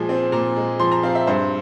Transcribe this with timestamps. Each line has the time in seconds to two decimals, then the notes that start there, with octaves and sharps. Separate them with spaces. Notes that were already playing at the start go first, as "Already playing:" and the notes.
Already playing: A#2 F3 G#3 G#5
0.09 C4
0.32 A#2 A#5
0.57 G#3
0.79 F3 C6
0.92 A#5
1.03 C4 F5
1.15 E5
1.27 G2 C5